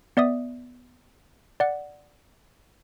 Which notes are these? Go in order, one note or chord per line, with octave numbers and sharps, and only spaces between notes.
B3 D5 E5 D#6
D5 F#5